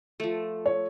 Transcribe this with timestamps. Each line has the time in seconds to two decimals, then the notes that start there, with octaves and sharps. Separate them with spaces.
0.20 F3 A3
0.66 C#5